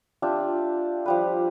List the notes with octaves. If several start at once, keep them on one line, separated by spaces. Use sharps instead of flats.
D4 F4 G4 E5
F3 G3 B4